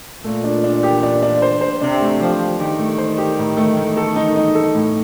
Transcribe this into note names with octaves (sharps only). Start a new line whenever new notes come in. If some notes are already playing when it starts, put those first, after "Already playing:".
A#2 A3
D4
D4
G4
D4
D4
C5
C5
C3 D4
A3
F3 G4
G4
D#3 G4
A3
C5
G4
A2
A3
A3
A4
D#4
D#4
A4
A2